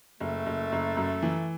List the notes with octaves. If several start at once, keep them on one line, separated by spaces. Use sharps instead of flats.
F#1 A3
F#1
F#1
F#2
E3